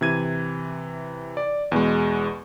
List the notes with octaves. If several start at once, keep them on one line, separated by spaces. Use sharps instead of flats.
C3 E3 G#6 D#7
D5
E2 B2 G#3